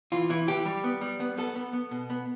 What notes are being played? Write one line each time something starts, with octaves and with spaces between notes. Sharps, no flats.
E3 F4
E3 E4
E3 G4
G3
B3
G3
B3
B3 A4
B3
B3
B2
B3